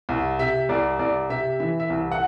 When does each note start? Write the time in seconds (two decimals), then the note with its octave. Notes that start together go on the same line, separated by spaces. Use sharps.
0.09 C2
0.39 C3 E5
0.69 C2 D5
0.99 C2 D5
1.30 C3 E5
1.60 E3 E5
1.80 E5
1.90 C2
2.12 F#5